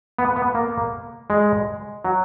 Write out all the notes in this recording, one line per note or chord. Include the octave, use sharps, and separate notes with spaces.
B3
B3
A#3
G#3
F#3